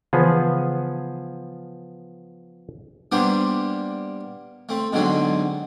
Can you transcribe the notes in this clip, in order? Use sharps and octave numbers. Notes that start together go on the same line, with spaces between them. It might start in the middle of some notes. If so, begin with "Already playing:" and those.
C#3 E3 F3 B3 G#4
G3 A#3 B3 D4 G4 C5
A3 C4
G#2 B2 D3 F#3 C4